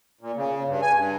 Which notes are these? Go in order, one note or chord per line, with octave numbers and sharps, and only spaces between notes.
A#2
C#3
G2
G#5
G2